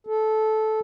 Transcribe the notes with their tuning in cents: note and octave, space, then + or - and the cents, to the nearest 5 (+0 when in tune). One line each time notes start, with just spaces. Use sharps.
A4 -15